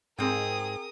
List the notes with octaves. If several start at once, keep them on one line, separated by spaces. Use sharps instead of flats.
G#2 C4 G#4 A#4 G5 D#6